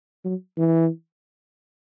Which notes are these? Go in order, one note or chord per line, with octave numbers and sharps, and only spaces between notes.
F#3
E3